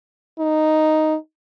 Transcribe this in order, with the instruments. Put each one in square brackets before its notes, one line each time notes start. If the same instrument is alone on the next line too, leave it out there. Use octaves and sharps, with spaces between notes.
[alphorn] D#4